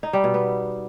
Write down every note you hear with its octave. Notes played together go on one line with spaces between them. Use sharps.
D#4
G3
B2
B3